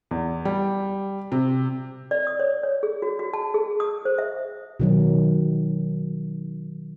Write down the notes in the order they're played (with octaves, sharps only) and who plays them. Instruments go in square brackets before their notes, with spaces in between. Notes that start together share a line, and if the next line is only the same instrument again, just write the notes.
[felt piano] E2
G3
C3
[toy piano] D5
D#6
C#5
C#5
G#4
F#4
F#4
A5
G#4
D#6
C5
E5
[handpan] B2 D#3 F#3